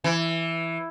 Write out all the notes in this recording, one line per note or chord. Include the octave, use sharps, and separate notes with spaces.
E3